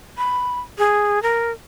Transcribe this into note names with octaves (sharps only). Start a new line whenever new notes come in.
B5
G#4
A#4